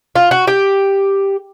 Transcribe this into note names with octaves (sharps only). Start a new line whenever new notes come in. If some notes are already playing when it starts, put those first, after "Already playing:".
F4
F#4
G4